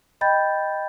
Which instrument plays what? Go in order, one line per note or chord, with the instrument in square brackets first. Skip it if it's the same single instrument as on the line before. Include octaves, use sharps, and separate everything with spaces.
[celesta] D#5 G5 B5 G6 A6